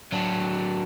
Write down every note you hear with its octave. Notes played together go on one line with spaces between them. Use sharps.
F#3 D4